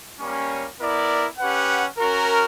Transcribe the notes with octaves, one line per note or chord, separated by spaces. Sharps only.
G3 A#3 C#4
B3 E4 A#4 D5
C#4 G4 B4 F#5
C#4 F#4 A#4